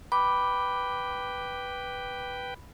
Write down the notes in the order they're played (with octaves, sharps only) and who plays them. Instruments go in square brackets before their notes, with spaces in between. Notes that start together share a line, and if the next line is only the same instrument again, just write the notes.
[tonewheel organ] B4 G5 [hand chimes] B5 [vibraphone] D6